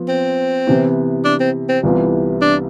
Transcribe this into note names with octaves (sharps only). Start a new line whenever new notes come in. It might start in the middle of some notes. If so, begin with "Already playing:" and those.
Already playing: F3 B3
C4
C3 E3 B3 E4
D4
C4
C4
C2 C3 E3 B3 F4
D4